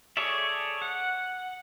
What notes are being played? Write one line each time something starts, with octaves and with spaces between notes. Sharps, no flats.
G#4 A4 C#5 D5 E5
F#5